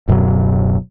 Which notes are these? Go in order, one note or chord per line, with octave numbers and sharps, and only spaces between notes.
D1 F#2 B2 F#3